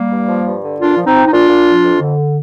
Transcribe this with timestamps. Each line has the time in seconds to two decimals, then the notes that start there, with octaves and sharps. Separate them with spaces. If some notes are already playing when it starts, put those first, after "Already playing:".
Already playing: G3 A#3
0.10 G2
0.27 F3
0.45 G2
0.62 D3
0.80 A#2 D4 F4
0.97 F3
1.05 C4 D#4
1.14 F3
1.25 D#4
1.32 A#2 D4 F4
1.49 A#2
1.66 F3
1.84 F2
2.00 D3